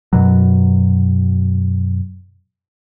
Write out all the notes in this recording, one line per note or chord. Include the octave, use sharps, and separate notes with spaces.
F#2 B2 F#3